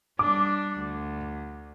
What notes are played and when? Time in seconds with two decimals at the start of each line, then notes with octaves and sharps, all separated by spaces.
0.19 G3 D4 D6
0.79 D2